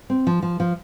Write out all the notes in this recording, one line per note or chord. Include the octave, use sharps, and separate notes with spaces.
C4
F3
F3
F3